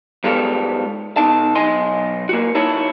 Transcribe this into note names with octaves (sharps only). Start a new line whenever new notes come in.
G#2 G3 G#3 B3 A4 F5
B2 D#4 A5
B1 D#5 G#5 C6
A#3 F#4
D#4 E4 F#4 C#5 A5